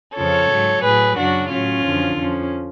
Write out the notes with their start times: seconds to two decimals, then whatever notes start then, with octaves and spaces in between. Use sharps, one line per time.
0.16 F2 C#3 F3 A4 C#5
0.50 G#2 F#3
0.83 A2 F#3 G#4 B4
1.17 F#2 C#3 F#3 D4 F#4
1.50 A2 F#3 C#4 F4
1.84 F#2 D3 F3
2.17 F2 F3 C#4